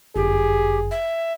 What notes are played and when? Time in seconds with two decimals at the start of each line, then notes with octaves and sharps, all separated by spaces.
0.16 G1 F#2 G4 G#4
0.91 E5